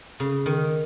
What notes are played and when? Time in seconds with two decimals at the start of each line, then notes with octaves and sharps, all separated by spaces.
0.20 C#3
0.46 D#3